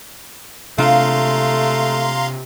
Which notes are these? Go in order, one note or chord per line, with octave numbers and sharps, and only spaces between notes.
C3 A3 D4 F4 F5 A#5 C6